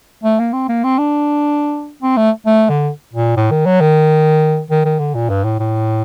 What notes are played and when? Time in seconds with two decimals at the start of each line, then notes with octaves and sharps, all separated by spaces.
0.24 A3
0.40 A#3
0.53 C4
0.69 A#3
0.84 C4
0.98 D4
2.02 C4
2.17 A3
2.47 A3
2.70 D3
3.13 A#2
3.37 A2
3.51 D#3
3.66 F#3
3.81 D#3
4.71 D#3
4.85 D#3
4.99 D3
5.15 A#2
5.30 G2
5.44 A2
5.60 A2